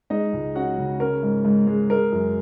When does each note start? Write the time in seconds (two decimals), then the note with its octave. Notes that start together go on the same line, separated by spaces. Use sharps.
0.10 G#3 D#4 D#5
0.33 C#2
0.55 C#4 F#4 F#5
0.78 C#3
1.00 C#4 A#4
1.23 G#2
1.45 G#2
1.67 G#3
1.90 G#3 A#4
2.12 F#2